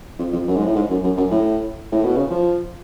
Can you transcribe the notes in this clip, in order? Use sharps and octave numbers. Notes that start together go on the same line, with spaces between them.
F2
F2
F#2
G#2
A2
G#2
F#2
F#2
F#2
A2
A2
B2
C#3
F3